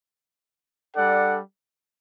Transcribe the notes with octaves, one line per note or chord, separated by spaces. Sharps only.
G3 D4 A4 D5 F#5